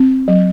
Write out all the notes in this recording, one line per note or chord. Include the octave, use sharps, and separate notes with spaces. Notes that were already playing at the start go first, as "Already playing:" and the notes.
Already playing: C4
F#3